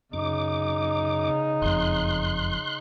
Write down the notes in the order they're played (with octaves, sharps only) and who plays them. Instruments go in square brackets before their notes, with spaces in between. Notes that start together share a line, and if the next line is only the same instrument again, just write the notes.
[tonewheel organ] F#2 D6 [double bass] C#3 D#4
[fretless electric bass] F#1 F2 [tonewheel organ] C6 F#6